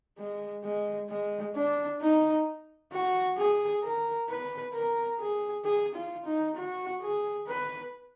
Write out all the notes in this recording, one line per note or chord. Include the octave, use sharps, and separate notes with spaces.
G#3
G#3
G#3
D4
D#4
F#4
G#4
A#4
B4
A#4
G#4
G#4
F4
D#4
F#4
G#4
B4